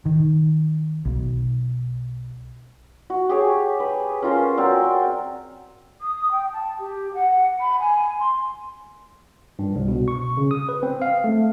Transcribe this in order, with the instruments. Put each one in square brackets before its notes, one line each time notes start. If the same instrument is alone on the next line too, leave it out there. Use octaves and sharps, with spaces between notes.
[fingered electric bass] D#3
B1
[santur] F#4
G4 G#4 C#5
B4
C#4 F4 A#4 C5
F#3 C4 A#4 D5
[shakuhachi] D#6
G5
A5
G4
F#5
B5
G#5
C6
[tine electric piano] G2
C2
B2
C#6
C#3
D#6
B4
C4
F5
A3